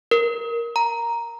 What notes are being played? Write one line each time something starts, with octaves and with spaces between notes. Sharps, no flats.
A#4
A#5